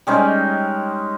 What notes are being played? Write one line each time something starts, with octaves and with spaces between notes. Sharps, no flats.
G3 G#3 C#4 D#4